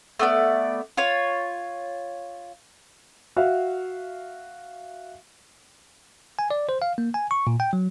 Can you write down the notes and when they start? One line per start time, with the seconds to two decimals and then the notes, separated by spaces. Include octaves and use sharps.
0.19 A3 B3 D5
0.97 F4 C#5
3.36 F#4 E5 F5
6.39 G#5
6.51 D5
6.69 C5
6.82 F5
6.98 A#3
7.14 G#5
7.31 C#6
7.47 A#2
7.60 G5
7.73 F#3